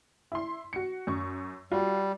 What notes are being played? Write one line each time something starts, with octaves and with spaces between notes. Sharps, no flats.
E4 C6
F#4 C#7
F#2 C#6
G3 F4 F#4